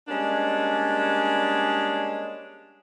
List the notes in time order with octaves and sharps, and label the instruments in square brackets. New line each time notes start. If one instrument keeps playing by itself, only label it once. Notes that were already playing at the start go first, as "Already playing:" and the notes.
[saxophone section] G3 G#3 A#3 C#4 D4